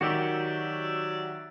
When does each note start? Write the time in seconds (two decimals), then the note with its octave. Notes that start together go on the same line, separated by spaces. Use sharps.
0.01 D#3 F#3 F#4 G4 D5 E5